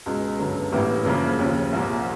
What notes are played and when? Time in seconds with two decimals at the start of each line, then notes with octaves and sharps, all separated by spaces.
0.06 C#2 B2 G#3
0.39 G1 F#2 D3 F#3 B3
0.72 A1 A2 E3 G3 A#3
1.05 F#1 F#2 C#3 F3 A#3
1.39 D#2 C#3 F3
1.72 C2 A#2 F3 A#3